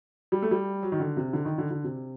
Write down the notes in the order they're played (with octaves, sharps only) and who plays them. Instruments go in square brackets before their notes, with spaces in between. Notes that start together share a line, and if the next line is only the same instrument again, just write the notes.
[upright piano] G3
A3
G3
F#3
D#3
D3
C3
D3
D#3
D3
D3
C3